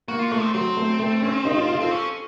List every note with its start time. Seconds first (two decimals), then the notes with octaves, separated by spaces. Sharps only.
0.08 A#3 F#4
0.19 F4
0.31 A3 F#4
0.43 C4
0.54 F#3 C4
0.77 A3
1.00 A3
1.22 C#4
1.45 D#4
1.57 F4
1.68 F4
1.79 C4 A4
1.91 C#4